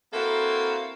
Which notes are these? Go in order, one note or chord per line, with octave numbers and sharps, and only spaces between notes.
A#3 C4 E4 F#4 A4 A#4